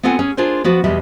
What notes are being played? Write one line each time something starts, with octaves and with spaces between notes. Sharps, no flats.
B3 C4 F4 A4 F#5 G#5
C#4 G#4
D4 F4 G#4 A#4 C5
F3 B3 F#4
E2 B2 G3 G#3 E5